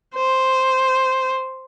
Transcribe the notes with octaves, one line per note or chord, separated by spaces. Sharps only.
C5